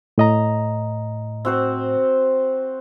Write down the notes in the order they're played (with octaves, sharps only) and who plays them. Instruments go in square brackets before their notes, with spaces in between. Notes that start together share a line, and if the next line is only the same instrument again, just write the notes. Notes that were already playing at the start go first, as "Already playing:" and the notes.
[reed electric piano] A2 D#5 A#5
[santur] C4 F#4 C5